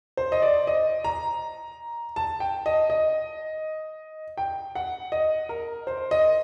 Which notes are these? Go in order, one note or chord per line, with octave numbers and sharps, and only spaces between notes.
C5
D#5
D5
D#5
A#5
A5
G5
D#5
D#5
G5
F#5
D#5
A#4
C5
D#5